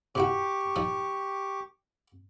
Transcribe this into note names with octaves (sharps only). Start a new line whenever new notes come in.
C3 E4 F#4 G4 C#6 D6
F3 D#4